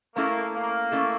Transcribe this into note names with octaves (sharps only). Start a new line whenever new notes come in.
A3 A#3 C#4 E4 A4
A#3
A3 C#4 E4 A4